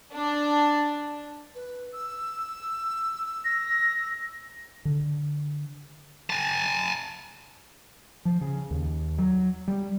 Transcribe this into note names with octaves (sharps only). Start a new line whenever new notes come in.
D4
B4
E6
A#6
D3
G#5 A5
F3
C#3
D#2
F#3
G3